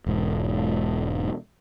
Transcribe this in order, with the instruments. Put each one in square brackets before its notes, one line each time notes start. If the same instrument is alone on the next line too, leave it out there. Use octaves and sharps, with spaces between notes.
[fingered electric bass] E1 G#2